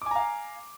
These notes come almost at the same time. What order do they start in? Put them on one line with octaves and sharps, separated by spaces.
D6 G#5 A#5 F5